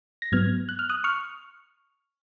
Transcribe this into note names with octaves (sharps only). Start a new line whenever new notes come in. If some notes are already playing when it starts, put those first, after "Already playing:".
A#6
G#2 F#3 B3 F6 G#6
F#6
F6
D#6 F#6
C#6 F6